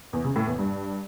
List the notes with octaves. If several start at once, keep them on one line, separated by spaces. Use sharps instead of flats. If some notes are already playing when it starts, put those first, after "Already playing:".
E2
C#3
A2
E2
G2